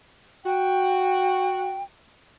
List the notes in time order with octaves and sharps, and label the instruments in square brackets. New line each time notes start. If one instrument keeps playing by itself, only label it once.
[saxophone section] F#4 [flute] G5